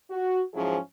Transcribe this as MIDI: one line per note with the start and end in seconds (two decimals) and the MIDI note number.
0.11 0.42 66
0.54 0.77 44
0.54 0.77 53
0.54 0.77 54
0.54 0.77 61
0.54 0.77 64
0.54 0.77 68